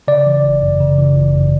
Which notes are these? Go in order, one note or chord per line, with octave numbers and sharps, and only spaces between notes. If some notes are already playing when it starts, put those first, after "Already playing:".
C#3 D5
E3
G1
F#2
C#3
E3
G1
F#2